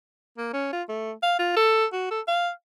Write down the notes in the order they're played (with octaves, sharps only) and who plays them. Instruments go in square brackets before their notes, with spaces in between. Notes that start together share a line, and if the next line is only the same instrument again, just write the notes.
[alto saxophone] A#3
C#4
F4
A3
F5
F4
A4
F#4
A4
F5